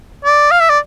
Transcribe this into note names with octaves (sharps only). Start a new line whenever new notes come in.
D5
F5
E5
D5